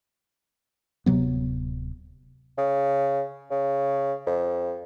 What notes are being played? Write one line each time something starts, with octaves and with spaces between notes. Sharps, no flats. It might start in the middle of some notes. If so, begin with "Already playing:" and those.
D1 C3 F#3 B3
C#3
C#3
F2